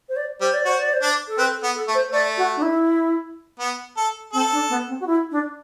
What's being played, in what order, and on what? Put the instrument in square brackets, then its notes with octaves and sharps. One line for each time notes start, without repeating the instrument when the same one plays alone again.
[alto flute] C5
D5
[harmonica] G3 [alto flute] C5
[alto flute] D5
[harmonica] F#4 [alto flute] C5
[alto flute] D5
C5
[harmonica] D4
[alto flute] A4
[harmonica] C4 [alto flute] B4
[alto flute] A4
[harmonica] B3
[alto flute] A4
[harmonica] A3
[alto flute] C5
[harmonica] A3 [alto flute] D5
[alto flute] F#4
D4
E4
[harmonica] B3
A4
[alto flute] C4 [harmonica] A4
[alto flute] D4
B3
C4
F#4
E4
D4